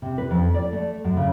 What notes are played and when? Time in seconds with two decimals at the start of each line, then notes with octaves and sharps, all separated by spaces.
0.02 C3
0.18 B4
0.31 F2
0.54 D5
0.72 A3
1.04 F#2
1.17 C#3